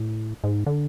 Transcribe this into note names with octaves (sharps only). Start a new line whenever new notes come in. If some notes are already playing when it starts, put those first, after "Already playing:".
Already playing: A2
G#2
D3